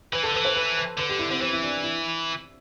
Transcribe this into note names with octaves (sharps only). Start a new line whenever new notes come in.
E3 B4
D3 A4
E3 B4
C5
B4
B4
D3 B4
G4
E4
D3 C4
E3 C4
E4
D4
E4